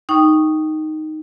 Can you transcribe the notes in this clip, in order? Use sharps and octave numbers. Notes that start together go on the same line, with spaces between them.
D#4 G5 C#6